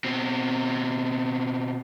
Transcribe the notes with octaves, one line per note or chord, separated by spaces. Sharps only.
B2 C4